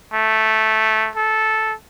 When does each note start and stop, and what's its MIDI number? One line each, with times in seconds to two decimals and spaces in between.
0.13 1.10 57
1.15 1.73 69